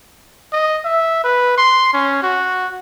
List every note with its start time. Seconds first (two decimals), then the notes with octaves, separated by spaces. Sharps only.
0.53 D#5
0.85 E5
1.24 B4
1.58 C6
1.93 C#4
2.23 F#4